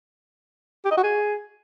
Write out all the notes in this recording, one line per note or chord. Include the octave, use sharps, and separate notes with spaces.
G4
D#5
F#4
G#4